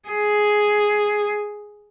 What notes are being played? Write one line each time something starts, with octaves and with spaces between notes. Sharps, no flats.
G#4